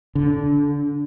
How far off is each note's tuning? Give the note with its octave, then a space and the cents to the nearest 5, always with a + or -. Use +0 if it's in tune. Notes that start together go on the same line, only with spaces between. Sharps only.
D3 -25